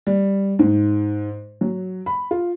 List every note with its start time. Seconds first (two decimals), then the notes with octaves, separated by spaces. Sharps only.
0.07 G3
0.59 G#2
1.61 F#3
2.06 B5
2.31 F4